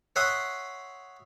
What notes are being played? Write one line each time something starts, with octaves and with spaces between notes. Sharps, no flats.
C#5 E5 F#5 C6 D#6